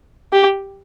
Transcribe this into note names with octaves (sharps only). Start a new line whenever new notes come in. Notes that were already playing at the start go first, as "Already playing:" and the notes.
G4